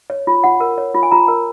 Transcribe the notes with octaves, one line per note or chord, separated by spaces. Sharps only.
C#5
F4
F4 F#5
A#4
C#5
F4
G#5
F4 A#5
A#4